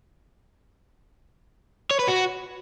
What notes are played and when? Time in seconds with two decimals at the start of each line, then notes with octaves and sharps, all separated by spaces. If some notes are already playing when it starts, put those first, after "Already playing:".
1.91 C#5
1.99 B4
2.08 F#4